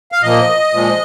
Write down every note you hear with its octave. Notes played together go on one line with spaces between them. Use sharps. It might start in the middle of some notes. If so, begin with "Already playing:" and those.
F5
A#2 F3 A#3 D#5
A#2 F3 G#3